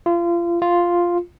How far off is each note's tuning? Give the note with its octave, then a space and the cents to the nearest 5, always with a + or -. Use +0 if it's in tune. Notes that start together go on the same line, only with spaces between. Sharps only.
F4 -30
F4 +0